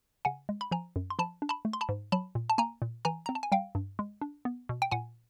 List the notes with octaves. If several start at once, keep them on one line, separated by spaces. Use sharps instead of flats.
C#3 F#5 G#5
G#3
B5
F3 G#5 A#5
F#2
C6
F3 A5 B5
D4
A5 B5
A3
C6
A5 B5
G#2
F#3 A5 B5
A#2
A5
A#3 G#5 A#5
A#2
E3 G#5 A#5
C4 A#5
A5
G#5
G3 F5 G5
G2
G#3
D4
B3
B2
G5
A#2 F#5 G#5